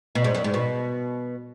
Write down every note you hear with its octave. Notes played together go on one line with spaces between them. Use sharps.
B2
G#2
F#2
G#2
B2